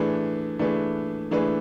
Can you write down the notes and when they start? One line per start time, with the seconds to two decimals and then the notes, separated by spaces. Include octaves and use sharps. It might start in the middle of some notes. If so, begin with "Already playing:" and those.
Already playing: E3 A3 D4 G#4 B4
0.59 E3 A3 D4 G#4 B4
1.31 E3 A3 D4 G#4 B4